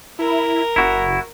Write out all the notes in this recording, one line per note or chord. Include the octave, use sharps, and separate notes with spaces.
E4 A#4
F#1 E4 F#4